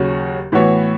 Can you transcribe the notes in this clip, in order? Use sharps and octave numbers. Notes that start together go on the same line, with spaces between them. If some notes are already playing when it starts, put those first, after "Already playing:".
Already playing: D#2 C#3 F#3 C#4 F#4
A2 E3 B3 F#4 C#5